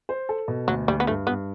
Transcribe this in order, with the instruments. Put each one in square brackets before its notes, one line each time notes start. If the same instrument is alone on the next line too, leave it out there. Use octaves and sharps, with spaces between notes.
[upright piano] C5
A4
B2
[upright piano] D2 [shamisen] F#3
[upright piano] D2 [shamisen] G3
[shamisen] B3
[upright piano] G2 [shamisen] A3
[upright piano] G2 [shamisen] B3